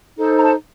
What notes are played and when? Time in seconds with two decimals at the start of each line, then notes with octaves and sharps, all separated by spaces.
0.17 D#4 A4 C5
0.38 A#5
0.43 A5